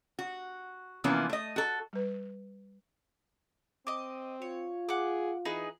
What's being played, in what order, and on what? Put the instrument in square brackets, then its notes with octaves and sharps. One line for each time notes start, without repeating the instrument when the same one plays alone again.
[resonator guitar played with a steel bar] F#4
C3 E3 F3 A#3 B3 C#4
A3 D#5
F#4 A4
[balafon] G3 B4
[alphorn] C4 [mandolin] D#5 D6
[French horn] F4 [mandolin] C#5
[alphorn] G#4 [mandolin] F#5 D6
[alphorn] E3 [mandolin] D#4 G#4 B4